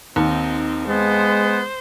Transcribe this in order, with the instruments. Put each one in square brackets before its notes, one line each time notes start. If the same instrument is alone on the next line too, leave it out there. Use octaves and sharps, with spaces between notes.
[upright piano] D#2 [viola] C4 D#4
[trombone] G#3 [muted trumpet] B3 [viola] C5